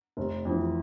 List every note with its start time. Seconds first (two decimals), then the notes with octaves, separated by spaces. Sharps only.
0.17 F1
0.45 F2
0.50 E3